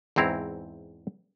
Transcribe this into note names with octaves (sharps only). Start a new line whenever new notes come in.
E2 G#2 C4 E4 A#5